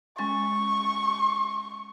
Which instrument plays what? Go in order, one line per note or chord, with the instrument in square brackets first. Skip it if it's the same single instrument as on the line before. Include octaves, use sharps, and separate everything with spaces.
[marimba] G#3 C#4 A6 [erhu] C#6